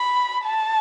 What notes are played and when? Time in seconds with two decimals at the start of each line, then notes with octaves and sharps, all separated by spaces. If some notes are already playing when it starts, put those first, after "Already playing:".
Already playing: B5
0.45 A5